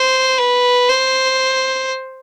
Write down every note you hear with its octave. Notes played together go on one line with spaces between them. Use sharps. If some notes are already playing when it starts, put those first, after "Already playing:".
Already playing: C5
B4
C5